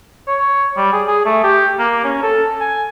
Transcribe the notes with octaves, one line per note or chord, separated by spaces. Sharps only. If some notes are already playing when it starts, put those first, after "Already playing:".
C#5
G3
G#4
G#4
A3
G4
A#3
C#4
A4
G#5